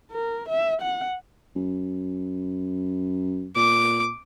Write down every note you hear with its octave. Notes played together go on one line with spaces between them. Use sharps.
A#4
E5
F#5
F#2
A#2 D6